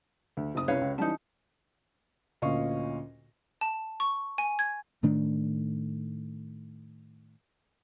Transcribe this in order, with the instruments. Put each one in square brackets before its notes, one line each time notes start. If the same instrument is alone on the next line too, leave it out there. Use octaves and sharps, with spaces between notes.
[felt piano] D2
F#1 D#6
[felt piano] C2 C#4 [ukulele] B4 C#5 F5
[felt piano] C#2
[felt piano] E3 G3 C#4 [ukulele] D#4 A5
[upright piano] D2 A#2 C#4 D#5 F5 C#6
[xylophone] A5
C#6
G#5
G#6
[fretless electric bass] A2 D#3 A3 D4